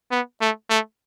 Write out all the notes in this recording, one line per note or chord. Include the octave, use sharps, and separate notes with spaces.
B3
A3
A3